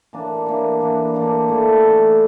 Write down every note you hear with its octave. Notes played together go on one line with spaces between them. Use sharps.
E3 A#3 D4
E3 A#3 D4
E3 A#3 D4
E3 A#3 D4
E3 A3 E4
E3 A3 E4